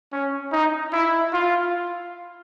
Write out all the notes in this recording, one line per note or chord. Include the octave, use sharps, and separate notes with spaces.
C#4
D#4
E4
F4